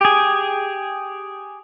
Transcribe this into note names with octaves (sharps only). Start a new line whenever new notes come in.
G4 G#4